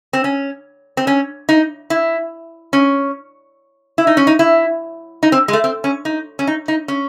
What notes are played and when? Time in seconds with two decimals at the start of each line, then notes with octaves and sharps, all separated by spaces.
0.13 C4
0.24 C#4
0.97 C4
1.07 C#4
1.49 D#4
1.90 E4
2.73 C#4
3.98 E4
4.07 D#4
4.17 C#4
4.27 D#4
4.39 E4
5.23 D#4
5.32 C4
5.48 G#3
5.53 A3
5.64 C4
5.84 C#4
6.05 D#4
6.39 C#4
6.47 D#4
6.68 D#4
6.88 C#4